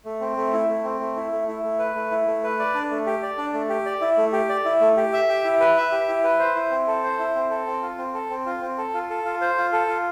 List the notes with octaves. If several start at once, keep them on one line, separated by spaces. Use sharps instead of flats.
A3
C4
A3
E4
A3
C4
A3
E4
A3
E4
A3
B4
A3
E4
A3
B4
D5
D4
A3
G4
D5
D4
A3
G4
D5
E4
A3
G4
D5
E4
A3
G4
E5
G4
E4
B4
E5
G4
E4
B4
C5
E4
C4
A4
C5
E4
C4
A4
C4
F4
C4
A4
C4
F4
C4
A4
F4
A4
F4
C5
F4
A4
F4